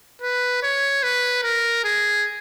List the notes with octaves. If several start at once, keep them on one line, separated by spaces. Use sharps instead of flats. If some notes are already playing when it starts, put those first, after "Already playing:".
B4
C#5
B4
A#4
G#4